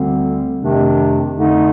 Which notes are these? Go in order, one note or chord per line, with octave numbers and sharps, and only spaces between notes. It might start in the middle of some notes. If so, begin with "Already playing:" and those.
Already playing: D2 D3 G3 C4
F2 C3 D#3 A3 D4
F2 D3 A3 D#4